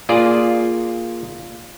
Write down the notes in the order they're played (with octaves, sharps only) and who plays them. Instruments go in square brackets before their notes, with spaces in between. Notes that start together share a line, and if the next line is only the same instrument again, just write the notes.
[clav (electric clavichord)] A#3 F4 G#4 D5